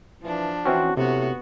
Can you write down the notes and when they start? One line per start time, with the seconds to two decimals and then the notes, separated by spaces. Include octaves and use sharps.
0.23 E3 F3 D4
0.65 E3 C4 C#4 F#4
0.97 A2 C3 B3 F#4